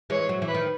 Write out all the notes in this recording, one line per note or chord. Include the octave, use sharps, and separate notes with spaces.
E3 G#3 C#5
F#3
E3
B4
D#3